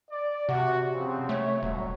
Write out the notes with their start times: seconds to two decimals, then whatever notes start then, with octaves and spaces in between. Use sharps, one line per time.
0.11 D5
0.49 C3 F#4
0.94 C#3 F3 C4
1.29 A3 C#5
1.63 D#1 F#3